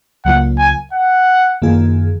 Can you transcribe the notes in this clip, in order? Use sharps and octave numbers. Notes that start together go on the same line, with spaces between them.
C#2 C#3 F#3 A#3 F4 F#5
G#5
F#5
F#2 D#3 A#3 F4 G#4